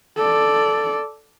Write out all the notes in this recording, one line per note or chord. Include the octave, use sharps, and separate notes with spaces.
A4 D5